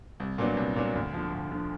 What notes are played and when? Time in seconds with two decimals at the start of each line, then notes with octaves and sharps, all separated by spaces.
0.20 C2
0.38 A#2 F#3 B3 D4
0.57 C2
0.76 A#2 F#3 B3 D4
0.95 D2
1.14 D3 F3
1.33 D2
1.51 D3 F3